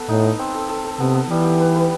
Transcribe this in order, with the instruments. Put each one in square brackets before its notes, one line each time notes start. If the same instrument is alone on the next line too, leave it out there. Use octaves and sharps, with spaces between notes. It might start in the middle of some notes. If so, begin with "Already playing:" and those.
Already playing: [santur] B3 A4
[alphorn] A2 [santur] D#4
[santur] D#4
C4
A4
A4
A4
[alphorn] C3 [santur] B3
[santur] B3
[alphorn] E3 [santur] G3
[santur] G4
B4
B4